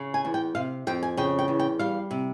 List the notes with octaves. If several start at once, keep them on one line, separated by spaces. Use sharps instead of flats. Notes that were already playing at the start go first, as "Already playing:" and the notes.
Already playing: C#3
G#5
E2
G5
C3 F5
F2 G5
G#5
C#3 G5
G5
E2
G5
G3 F5
C3